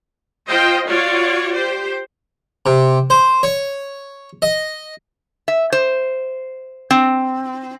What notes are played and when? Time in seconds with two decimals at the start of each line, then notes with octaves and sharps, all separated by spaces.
0.48 F4 C5 D#5 G5
0.88 F4 F#4 C#5 D5
1.55 G4 C5
2.66 C3
3.10 C5
3.43 C#5
4.42 D#5
5.48 E5
5.72 C5
6.91 C4